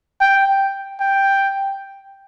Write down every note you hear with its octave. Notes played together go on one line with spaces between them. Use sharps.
G5
G5